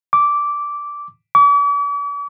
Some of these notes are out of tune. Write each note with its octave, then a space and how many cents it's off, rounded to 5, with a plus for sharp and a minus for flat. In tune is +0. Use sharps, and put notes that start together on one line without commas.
D6 -10
D6 -45